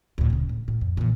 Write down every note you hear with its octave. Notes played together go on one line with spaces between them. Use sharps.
D2 A2
D1 C#3
A2
A2
F2
A#2 E3